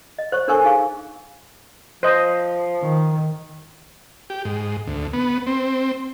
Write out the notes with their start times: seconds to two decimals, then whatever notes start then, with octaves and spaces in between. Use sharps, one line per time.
0.18 D#5
0.32 C5 C#5 C#6
0.48 D4 A4 A#4 C5 G#5 C#6
0.64 D#4 G#4 F5 C#6
2.03 F3 C5 D#5
2.81 D#3
4.30 G4
4.45 G#2
4.87 D2
5.13 B3
5.47 C4